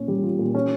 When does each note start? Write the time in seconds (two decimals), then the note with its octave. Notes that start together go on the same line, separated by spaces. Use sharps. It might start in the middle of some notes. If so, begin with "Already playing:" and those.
Already playing: A#2 C#4
0.08 G3
0.23 F4
0.39 A#2
0.55 C#4